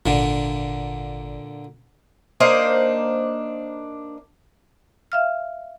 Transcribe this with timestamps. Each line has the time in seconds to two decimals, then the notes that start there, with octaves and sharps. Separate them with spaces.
0.06 G#1 A#2 D3
2.40 A#3 D4 D#4 C5
5.12 E5 F5 F6